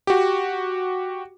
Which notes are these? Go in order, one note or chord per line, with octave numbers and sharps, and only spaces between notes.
F#4 G4